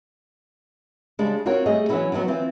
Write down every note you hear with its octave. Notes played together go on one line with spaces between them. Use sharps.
C#3 G3 G#3 D4
C4 F4 F#4 A#4 C#5
G3 A3 G#4 D#5
E3 F#3 B3 C#4 E4 F#4
D3 D#3 F3 F#3 B3
E3 C4 F4